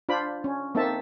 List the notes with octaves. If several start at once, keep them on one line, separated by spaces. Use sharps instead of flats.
D4 F4 C5 B5
C#4
A#3 C4 D#4 A4 E5 A5